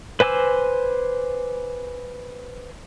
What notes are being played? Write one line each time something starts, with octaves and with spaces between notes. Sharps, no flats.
B4 C5 G#5 D6 E6